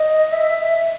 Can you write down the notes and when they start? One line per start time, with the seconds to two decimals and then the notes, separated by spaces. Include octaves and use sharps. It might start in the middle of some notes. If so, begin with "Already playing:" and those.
Already playing: D#5
0.32 E5